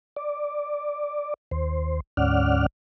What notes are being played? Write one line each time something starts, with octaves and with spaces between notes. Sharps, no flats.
D5
D#2 C5
D2 G#2 C#4 D5 F#5 F6